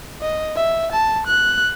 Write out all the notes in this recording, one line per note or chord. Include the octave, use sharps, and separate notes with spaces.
D#5
E5
A5
F#6